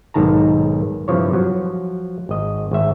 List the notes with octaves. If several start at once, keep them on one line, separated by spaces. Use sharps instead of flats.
B1 G#2 D#3 A5 A#5
G2 C3 E3 F3 C#5
F3 F#3
G#1 D#5
G#1 E5